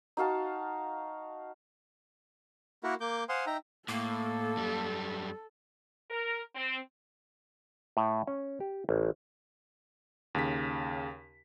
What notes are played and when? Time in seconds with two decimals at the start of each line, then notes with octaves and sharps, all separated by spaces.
0.17 D#4 F#4 F5 A5
2.84 A#3 E4 F#4 A#4
3.01 A#3 D6 G6
3.29 C5 F5 F#5 G#5 C6 D#6
3.47 D#4 E5 G5 A#5
3.89 A2 A#3 A4
4.57 F#2 G3
6.10 A#4
6.55 C4
7.97 A2
8.27 C#4
8.60 G4
8.89 A1
10.35 D#2 C#3 B6